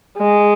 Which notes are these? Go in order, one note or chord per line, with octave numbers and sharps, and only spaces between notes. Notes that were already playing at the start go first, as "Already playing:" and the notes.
G#3